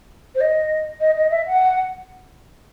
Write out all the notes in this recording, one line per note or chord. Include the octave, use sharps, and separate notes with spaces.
C5
D#5
D#5
D#5
E5
F#5